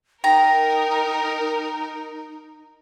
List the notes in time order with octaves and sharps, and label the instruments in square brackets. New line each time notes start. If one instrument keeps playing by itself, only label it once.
[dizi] D#4 [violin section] A#4 [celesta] G5 [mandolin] A#5